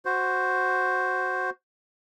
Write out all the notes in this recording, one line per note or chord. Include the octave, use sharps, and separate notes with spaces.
F#4 C5